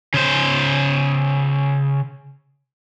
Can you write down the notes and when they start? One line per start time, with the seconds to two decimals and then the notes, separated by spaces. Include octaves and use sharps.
0.14 C#3 C5